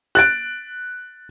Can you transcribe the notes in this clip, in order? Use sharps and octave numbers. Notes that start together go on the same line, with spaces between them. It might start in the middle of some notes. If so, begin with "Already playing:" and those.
F#6 A6 D7